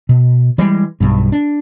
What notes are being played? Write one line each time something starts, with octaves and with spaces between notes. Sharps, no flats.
B2
E3 G3 G#3
B1 G2
D4